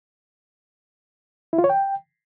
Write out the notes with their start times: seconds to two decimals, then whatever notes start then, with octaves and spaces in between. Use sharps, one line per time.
1.53 E4
1.58 F4
1.64 C#5
1.70 G5